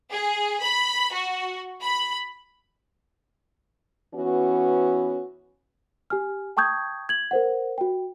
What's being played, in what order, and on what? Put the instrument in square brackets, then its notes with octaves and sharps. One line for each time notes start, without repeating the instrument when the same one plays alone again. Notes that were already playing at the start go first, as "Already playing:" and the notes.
[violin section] G#4
B5
F#4
B5
[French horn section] E3 B3 C#4 F#4
[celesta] G4 G#5 F6
G5 A5 C#6 D#6 G6 G#6
G#6 F#7
A#4 C5 F#5
F#4 G5